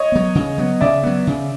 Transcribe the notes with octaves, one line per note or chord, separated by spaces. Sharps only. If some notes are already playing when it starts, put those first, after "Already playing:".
Already playing: C#5 D#5
F#3 B3
C#3
F#3 B3
C#3 D5 E5
F#3 B3
C#3